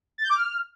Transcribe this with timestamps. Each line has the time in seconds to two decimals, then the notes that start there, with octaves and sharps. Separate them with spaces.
0.18 A6
0.24 G6
0.29 D6
0.35 F6